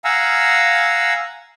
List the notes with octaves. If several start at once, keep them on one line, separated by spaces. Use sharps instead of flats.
F5 F#5 G#5 A#5 E6